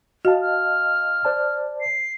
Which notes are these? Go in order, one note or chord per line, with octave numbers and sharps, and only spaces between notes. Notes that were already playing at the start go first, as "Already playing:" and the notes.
F#4 D#5 F5 A5
F6
C5 D5 A5
C7